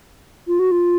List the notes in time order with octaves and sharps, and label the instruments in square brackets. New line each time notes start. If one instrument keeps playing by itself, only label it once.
[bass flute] F4
F#4
F4